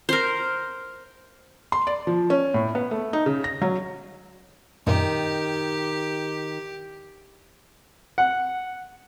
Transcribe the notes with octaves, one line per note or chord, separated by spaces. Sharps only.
A#4 C5
C6
D5
F3
C#4
A2
B3
A3
D#4
C#3
A#6
F#3
F#2 A#2 D#3 G4
F#5